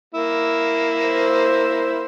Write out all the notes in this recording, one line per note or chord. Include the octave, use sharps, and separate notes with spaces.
A#3 E4
C5